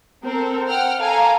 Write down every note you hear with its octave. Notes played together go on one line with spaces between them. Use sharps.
C4 A4 A#4
F#5 G5 F6
A4 F5 G#5 A#5